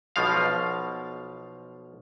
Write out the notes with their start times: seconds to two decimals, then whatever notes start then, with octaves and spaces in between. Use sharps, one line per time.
0.16 B1 B2 F3 F5